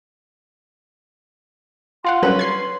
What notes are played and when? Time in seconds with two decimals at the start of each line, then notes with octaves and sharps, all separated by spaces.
2.05 F4 F5 F#5 C6
2.23 F#3 G3 C#4 F#4 B4
2.39 G#6 C7